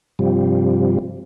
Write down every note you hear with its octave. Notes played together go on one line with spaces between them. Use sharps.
G2 C3 F3 G3